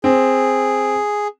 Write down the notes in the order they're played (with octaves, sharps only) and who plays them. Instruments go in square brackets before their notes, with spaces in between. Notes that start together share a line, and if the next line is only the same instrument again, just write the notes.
[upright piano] C4 [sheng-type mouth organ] G#4